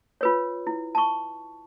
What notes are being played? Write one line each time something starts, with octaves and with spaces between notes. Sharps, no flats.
F4 B4 C#5
E4
A5 C#6